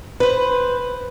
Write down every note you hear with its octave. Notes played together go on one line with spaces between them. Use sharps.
B4 C5